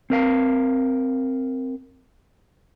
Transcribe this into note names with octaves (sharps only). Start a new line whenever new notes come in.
C4 A#4 F5